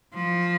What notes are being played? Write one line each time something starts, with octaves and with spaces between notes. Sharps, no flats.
F3